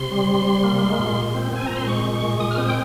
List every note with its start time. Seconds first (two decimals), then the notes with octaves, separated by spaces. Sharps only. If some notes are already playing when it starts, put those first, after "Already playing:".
Already playing: C3 C6
0.11 G3
0.29 C3
0.46 G3
0.64 A#3
0.81 G#3
0.99 A#2
1.17 A#2
1.35 C4
1.52 C4 G#5
1.66 A#2 A#5
1.77 C6
1.87 G#3 C#6
2.05 A#2
2.14 C#6
2.22 G#3
2.40 A#2 D#6
2.51 F6
2.58 C4 D#6
2.68 G5